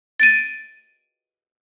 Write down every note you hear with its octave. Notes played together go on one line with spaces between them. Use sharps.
A6 D7 D#7